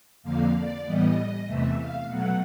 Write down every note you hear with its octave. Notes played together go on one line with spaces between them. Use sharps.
F2 D3 F3 A#3 F5
D5
A2 E3 G3 B3 D#5
E2 C3 E3 A3 E5
F5
B2 F#3 A3 F#5